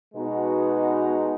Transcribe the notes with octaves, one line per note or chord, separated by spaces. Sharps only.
B2 G#3 B3 D#4 F#4